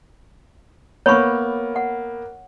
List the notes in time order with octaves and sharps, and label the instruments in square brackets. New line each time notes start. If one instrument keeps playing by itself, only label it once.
[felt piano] A#3 B3 [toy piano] C#5 B5 C#6
[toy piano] F#5